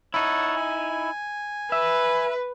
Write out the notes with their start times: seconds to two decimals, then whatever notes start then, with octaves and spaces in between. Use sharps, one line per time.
0.14 D#4 E4 C#5 F#5 A5
0.56 G#5
1.72 B4 E5